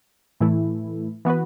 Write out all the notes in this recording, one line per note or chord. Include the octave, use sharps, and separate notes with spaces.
A2 E3 A3 E4
E3 B3 F#4 B4